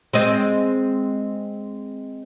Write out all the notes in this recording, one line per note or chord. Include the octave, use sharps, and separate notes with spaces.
G#3 C4 D#5